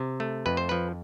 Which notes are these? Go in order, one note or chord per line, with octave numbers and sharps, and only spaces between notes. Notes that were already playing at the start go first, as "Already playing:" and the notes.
Already playing: C3
A3
F2 B4
C5
F3 B4